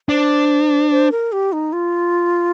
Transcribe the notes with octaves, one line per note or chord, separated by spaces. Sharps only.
D4 C5
C5
A#4
G4
D#4
F4